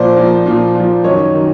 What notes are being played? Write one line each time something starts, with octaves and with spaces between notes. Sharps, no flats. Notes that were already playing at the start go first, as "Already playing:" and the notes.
Already playing: A#2 F3 C5 D5
A#2 F3
A#2 F3
A#2 F3
F#2 D#3 F#3 C#5 D#5
D#3 F#3